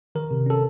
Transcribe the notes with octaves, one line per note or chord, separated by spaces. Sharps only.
D#3 A#4
C3
C#4 A4